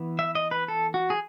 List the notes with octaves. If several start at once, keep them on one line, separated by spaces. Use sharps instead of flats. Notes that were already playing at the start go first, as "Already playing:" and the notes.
Already playing: E3 B3
E5
D#5
B4
A4
F#4
G#4